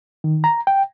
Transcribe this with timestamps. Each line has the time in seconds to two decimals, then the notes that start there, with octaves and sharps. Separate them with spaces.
0.24 D#3
0.44 A#5
0.67 G5